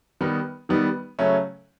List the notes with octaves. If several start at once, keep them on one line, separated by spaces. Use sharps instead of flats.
D#3 G3 B3 D#4
D#3 G3 B3 D#4
C#3 F#3 A3 C#4